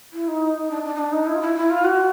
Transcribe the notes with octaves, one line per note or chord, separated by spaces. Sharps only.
E4
D#4
D4
D4
D#4
D4
D#4
E4
F4
E4
E4
F4
F#4